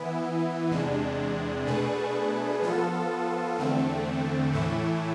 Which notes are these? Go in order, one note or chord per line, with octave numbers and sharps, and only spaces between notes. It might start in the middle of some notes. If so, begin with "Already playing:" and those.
Already playing: E3 B3 E4
E2 C3 G#3 D4
B2 A3 D4 G#4 B4
F3 B3 F4 A4
E2 D3 A3 C4
A2 E3 A3 E4